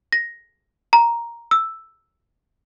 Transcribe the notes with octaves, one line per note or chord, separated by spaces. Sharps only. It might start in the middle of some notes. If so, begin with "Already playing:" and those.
A#6
A#5
E6